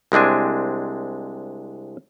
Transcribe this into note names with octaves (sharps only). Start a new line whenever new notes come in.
C2 G#3 C4 D4 G#5